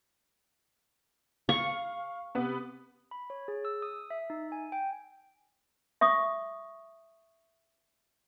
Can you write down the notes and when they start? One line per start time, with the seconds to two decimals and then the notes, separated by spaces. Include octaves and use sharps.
1.49 F5 C#6
2.35 C3 B3 B4
3.11 B5
3.30 C#5
3.48 G#4
3.65 E6
3.82 D#6
4.10 E5
4.30 D#4
4.52 G#5
4.72 G5
6.01 E5 C#6 D#6